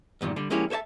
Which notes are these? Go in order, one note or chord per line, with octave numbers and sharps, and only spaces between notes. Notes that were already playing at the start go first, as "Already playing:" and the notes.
E2 G2 A#2 D#3
D3 G3 D4
F3 G#3 A#3 C#4 E4 G4
A4 C5 C#5 E5 A5